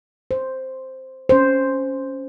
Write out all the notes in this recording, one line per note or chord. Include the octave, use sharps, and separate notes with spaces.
C5
C#4 C5